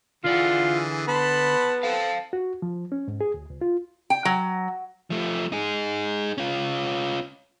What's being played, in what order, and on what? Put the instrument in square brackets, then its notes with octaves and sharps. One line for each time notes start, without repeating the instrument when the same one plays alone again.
[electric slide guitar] D3 D5 F#5 [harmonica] E3 G#4 [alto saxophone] F4
[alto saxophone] B3 [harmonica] A5 B5 C6
[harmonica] C4 A4 [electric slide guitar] F5 A5
[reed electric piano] F#4
F3
C#4
G#2
G#4
D2
C#2
F4
[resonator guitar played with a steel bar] G5
F#3
[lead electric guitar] F3 A3
D#4 G#4
C#4 F4